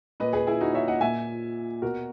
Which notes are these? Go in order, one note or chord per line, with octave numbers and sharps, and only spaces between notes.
A#2 B4 D#5
G#4 B4
E4 G#4
D#4 F#4
C#5 E5
D#5 F#5
A#2 E5 G#5
B2 F#4 A#4